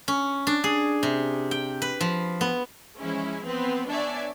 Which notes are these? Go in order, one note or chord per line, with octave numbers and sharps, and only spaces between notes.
C#4
D4
G#4
C3
G5
B4
F3
B3
E3 F3 G#3 C#4 E4
B3 C4 B4
B3 D4 C#5 D5 E5 G#5